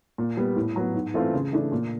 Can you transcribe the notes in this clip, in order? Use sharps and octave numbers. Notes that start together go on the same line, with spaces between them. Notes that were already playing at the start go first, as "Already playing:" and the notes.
A#2
G3 B3
A2
F#3 B3
G#2
E3 A3 C4 F4
C#3
E3 A3 D4
A#2